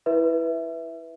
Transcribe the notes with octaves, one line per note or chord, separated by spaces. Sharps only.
E4 B4 E5